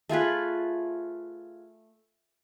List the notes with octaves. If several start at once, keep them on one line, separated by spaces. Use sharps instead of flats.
A3 F4 G#4 B4